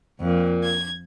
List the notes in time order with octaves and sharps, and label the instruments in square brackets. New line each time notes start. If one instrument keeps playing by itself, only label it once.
[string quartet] F2 [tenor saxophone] A#2
[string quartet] G#6